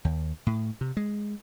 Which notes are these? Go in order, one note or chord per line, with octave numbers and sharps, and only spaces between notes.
D#2
A2
C3
G#3